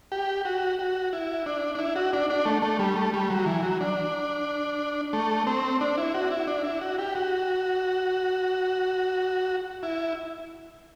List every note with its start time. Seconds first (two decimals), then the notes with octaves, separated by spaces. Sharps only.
0.12 G4
0.45 F#4
0.79 F#4
1.13 E4
1.46 D4
1.75 D4
1.79 E4
1.96 F#4
2.13 D4
2.30 D4
2.46 A3
2.62 A3
2.79 G3
2.96 A3
3.13 G3
3.30 F#3
3.46 E3
3.63 F#3
3.81 D4
5.13 A3
5.47 C4
5.81 D4
5.98 E4
6.14 F#4
6.31 E4
6.47 D4
6.64 E4
6.81 F#4
6.98 G4
7.15 F#4
9.83 E4